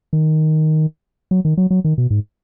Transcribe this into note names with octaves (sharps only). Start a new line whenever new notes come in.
D#3
F#3
D#3
F#3
F#3
D#3
B2
G#2